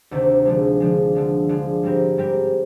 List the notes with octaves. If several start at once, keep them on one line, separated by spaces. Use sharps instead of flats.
D2 C3 D#3 A#3
D3 F3 G#3
D3 F3 G#3
D3 F3 G#3
D3 F3 G#3
G#2 G3 C4 G4 A#4
G#2 G3 C4 G4 A#4